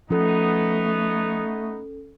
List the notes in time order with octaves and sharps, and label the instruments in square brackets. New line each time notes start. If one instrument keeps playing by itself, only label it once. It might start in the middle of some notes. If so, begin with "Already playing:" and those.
[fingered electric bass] F3 [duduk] A3 [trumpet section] B3 D#4 [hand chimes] C#4 A4